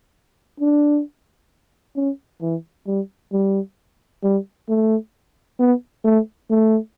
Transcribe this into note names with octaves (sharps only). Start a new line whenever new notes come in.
D4
C#4
E3
G3
G3
G3
A3
B3
A3
A3